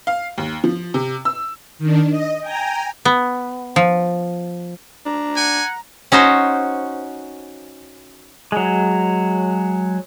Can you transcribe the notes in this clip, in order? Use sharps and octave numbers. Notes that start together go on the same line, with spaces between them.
F5
D#2
F3
C3
E6
D#3 D4
D#5
G5 G#5 A#5
B3
F3
D4 A#5
F#5 G#5
C#4 D#4 F#4 C5
F#3 G#3